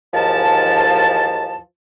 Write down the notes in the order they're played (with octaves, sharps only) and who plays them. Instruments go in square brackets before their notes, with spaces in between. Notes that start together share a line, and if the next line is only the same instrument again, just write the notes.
[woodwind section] D#2 G#2 E3 F3 A5